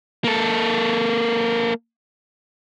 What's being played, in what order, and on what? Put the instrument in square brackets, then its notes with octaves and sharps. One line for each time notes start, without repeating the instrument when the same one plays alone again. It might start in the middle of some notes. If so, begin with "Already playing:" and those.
[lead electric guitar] A#3 A4